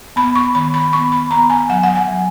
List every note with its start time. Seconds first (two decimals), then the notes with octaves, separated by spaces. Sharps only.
0.16 B3 B5
0.35 C#6
0.55 D#3 B5
0.74 B5
0.93 B3 C#6
1.12 B5
1.31 B3 A#5
1.50 G#5
1.69 F#3 F#5
1.83 F#5
1.95 G#5
2.08 F#3